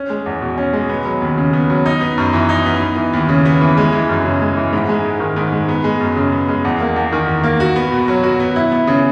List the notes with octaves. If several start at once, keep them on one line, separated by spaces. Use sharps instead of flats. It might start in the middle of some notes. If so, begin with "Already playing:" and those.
Already playing: C#4
G#3
E2
B2
C#4
G#3
B3
F#3
D#2
C#3
B3
F#3
D#4
B3
F#2
E3
D#4
B3
B3
E3
D#2
C#3
B3
E3
G#3
E3
F#2
C#3
G#3
E3
G#2
G#3
G#2
D#3
G#2
G#3
B3
G#3
F#2
C#3
B3
G#3
E2
A#3
E2
D#3
E2
A#3
F#4
B3
B2
F#3
F#4
B3
E4
B3
C#3